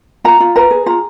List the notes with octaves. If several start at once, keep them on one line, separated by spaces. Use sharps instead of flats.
F4 A#5
F4
B4 A#5
G#4
F4 A#5